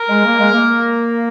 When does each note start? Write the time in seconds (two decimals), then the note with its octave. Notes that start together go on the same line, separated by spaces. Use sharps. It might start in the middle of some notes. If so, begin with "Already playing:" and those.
Already playing: A#4
0.09 G#3
0.25 A#3
0.39 G#3
0.52 A#3